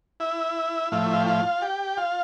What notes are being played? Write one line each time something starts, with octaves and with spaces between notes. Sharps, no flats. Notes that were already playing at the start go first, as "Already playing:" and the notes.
E4 E5
A2 F3 A3 E4 F5
E5
F4 F5
G5
F4 F5
G4 G5
F4 F5